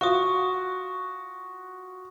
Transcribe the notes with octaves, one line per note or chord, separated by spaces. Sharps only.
F4 F#4 C#6 D#6